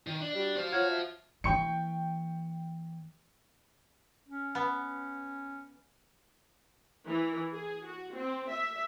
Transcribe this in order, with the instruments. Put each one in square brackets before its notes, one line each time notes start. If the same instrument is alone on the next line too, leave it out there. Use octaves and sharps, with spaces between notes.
[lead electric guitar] D#3
[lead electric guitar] D4 [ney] D5
[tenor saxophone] G3 [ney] F#4
[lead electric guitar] C5 F5
[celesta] F4 F6 G#6 [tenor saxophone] F#4 [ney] C#5
[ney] E5
[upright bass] E3 A#3 [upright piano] G5 C#6 C#7
[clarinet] C#4
[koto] B3
[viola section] E3
G#4
F#4
C4
E5